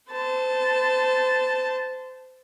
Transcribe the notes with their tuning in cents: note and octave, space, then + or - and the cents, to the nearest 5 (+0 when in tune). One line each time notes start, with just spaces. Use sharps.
C5 -25 A5 +0